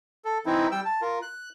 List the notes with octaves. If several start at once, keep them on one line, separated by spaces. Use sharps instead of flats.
A4
E3 C4 D#4 E4
G3 G5 E6
A5
F4 A#4
F#6